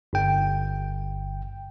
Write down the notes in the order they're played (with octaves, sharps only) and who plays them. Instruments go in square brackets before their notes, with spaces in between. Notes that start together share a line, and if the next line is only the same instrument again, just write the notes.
[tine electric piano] G1 G5